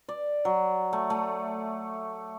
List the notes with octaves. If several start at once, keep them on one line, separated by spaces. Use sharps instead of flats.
D5
F#3
A3
A3